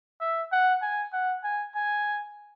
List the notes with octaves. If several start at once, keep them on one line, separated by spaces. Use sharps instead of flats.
E5
F#5
G#5
F#5
G#5
G#5